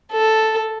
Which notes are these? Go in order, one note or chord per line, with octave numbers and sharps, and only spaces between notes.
A4